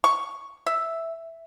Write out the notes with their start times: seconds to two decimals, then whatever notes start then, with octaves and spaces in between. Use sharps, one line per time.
0.04 C#6
0.66 E5